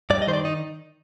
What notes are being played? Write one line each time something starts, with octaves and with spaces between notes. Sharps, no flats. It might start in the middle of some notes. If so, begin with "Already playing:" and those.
G2 D5
D#5
D#3 C5
D5
D#4